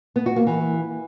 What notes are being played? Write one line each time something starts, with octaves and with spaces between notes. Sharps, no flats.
B3
F#4
A#3
E3